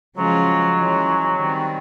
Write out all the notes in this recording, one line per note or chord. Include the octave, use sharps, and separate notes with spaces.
C#3 F3 F#3 G#3 C#4 F4
E3 G#3 C#4
D#3 G3 C4